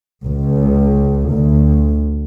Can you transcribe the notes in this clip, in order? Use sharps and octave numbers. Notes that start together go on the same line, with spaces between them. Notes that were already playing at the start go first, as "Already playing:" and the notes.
C#2
D2